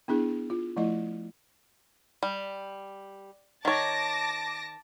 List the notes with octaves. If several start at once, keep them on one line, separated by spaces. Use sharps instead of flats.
B3 D4 E4 G#4
F4
F3 A3 E4 D#5
G3
D#3 C#5 A5 D6 A#6